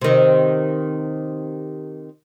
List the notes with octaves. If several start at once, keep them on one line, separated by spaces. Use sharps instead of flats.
C3 D#3